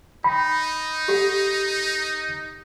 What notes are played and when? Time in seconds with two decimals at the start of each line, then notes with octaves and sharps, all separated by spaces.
0.24 D#4 G5 B5
1.08 G4 A4 F#5